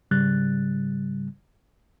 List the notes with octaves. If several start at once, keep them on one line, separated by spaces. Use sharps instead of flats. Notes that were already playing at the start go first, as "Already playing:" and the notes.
G#2 C#3 G3 F#6 A6